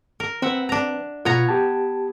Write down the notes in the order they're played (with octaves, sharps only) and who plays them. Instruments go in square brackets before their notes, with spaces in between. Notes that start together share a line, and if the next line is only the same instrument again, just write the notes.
[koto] A#4
[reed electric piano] C4 B4 [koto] E5 F#5
[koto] D4 A#5
[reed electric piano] B2 F4 [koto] B3 C#5 A#5
[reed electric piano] G4 A5